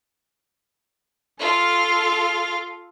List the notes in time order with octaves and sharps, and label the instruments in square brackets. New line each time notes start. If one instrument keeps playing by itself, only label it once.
[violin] F4 F5 [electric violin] A4